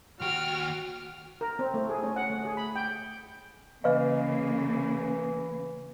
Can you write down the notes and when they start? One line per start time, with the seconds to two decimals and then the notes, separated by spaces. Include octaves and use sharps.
0.21 D#2 F#4 G5 F6
1.41 A#4
1.59 C4
1.74 A3
1.89 G#4
2.03 C#4
2.16 F#5
2.30 A3
2.45 G#4
2.57 B5
2.76 G5
3.84 C#3 E3 A#3 B4 D#5 F5